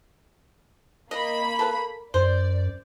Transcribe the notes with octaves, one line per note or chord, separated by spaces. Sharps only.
A#3 D#5 B5
A4 B4
F#2 C5 D5